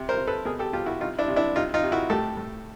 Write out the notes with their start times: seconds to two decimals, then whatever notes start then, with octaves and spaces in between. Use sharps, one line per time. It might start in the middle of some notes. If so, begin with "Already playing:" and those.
Already playing: C3
0.09 A#4 C5
0.18 C3
0.27 A4 B4
0.45 B2 G#4 A#4
0.59 G4 A4
0.73 B2 F4 G4
0.86 E4 F#4
1.00 C3 D#4 F4
1.18 D4 E4
1.28 C3
1.36 D4 E4
1.55 C3 D#4 F4
1.74 D#4 F4
1.83 C3
1.92 E4 F#4
2.10 A2 G4 A4
2.37 A2